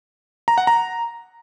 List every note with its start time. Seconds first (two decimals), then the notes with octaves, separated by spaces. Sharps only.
0.48 A#5
0.58 F#5
0.67 A#5